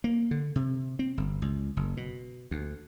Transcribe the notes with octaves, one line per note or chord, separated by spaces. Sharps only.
A#3
D3
C3
C4
G1
C#2
F#1
B2
D2